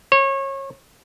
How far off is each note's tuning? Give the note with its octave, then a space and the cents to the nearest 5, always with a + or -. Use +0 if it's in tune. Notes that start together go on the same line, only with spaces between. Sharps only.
C#5 -30